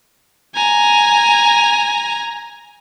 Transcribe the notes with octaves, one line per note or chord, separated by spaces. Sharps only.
G#5 A#5